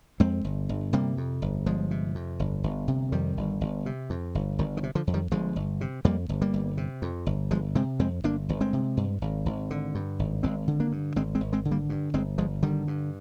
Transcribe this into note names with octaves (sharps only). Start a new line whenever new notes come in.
F2 G#3 C4
G1
G1
C3 G3 A#3
F2
G1
G1 F3 G#3
C3
F2
G1
G1
C3
F2 D#3 G3
G1
G1
C3
F2
G1
G1 D#3
D#3
C3
D3 F3
F2
D#3 G3
G1 F3 G#3
G1
C3
F2 G3 A#3
G1
G3 A#3
G1
C3
F2
G1
G1 F3 G#3
C3 G#3 C4
F2 G#3 C4
G1 A#3 D4
G1
G#3 C4
C3
G2
G#1
G#1
D3
G2
G#1
G#1 G#3 C4
D3
A#3 D4
G2
G#1 G#3 C4
G#3 C4
G#1
G#3 C4
D3
G3 A#3
G2
G1 G#3 C4
G1 F3 G#3
D3 D#3 G3
G2